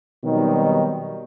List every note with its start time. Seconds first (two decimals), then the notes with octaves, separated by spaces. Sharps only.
0.25 B2 D#3 F#3 G3 C4 D#4